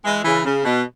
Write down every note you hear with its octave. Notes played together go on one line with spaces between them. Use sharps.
E3 G#3
C#3 E3
C#3
B2